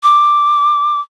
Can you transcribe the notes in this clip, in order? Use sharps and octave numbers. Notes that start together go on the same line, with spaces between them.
D6